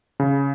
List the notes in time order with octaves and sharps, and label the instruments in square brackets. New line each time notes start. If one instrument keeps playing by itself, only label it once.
[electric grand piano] C#3